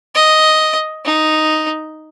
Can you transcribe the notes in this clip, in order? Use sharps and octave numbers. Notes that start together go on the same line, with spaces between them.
D#5
D#4